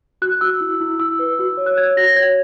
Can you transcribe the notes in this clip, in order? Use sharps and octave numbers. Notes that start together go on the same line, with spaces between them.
F#4 F#6
F#4 E6
E4
E4
E4 E6
B4
F#4
C#5
F#6
C#5 G#6
F#4 A#6
C#5 G#6